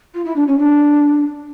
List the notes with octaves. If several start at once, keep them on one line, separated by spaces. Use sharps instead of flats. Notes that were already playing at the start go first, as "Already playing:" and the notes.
F4
E4
D4
C#4
D4